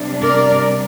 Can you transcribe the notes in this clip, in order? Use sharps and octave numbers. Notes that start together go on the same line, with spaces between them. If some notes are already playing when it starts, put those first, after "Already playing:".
Already playing: C3 G3 D4
A#4 D5